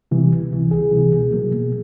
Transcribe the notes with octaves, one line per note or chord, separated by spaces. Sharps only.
C3 E3 G3
C#2
C3 E3 G3
C#2 G#4
C3 E3 G3
B2
F#3 A#3
B2